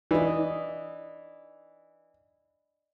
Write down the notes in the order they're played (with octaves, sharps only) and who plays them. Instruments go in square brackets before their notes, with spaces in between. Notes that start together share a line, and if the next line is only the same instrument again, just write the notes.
[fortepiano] E3 [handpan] D5 D#5